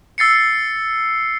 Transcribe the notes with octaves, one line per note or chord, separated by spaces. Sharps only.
E6 A6 C7 C#7